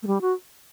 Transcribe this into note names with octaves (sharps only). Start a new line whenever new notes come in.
A3
G3
F#4